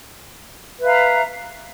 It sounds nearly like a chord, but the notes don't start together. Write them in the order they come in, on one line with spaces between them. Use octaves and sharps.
B4 E5 F5 A#5